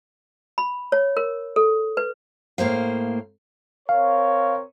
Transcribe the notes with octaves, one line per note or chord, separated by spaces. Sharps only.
B5
C#5
A#4
A4
B4
A2 A#3 C5 F5
C4 A#4 C#5 F5